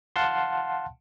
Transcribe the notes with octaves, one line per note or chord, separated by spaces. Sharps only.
F5 F#5 A5 C6